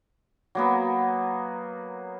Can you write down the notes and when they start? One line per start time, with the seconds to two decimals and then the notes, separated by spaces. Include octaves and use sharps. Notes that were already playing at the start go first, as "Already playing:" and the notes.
0.55 F#3 A#3 B3